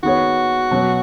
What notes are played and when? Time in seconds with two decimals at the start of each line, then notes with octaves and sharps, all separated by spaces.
0.03 D#3 B3 F#4 G#4 C#5
0.71 B2 F#3 C#4